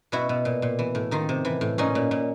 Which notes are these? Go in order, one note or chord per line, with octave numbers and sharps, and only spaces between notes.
B2 E4 F#4
B2
A#2
A#2
E3
A2
D#3 D#4 F4
C3
E3
A2
A#2 C#4 D#4
A#2
A#2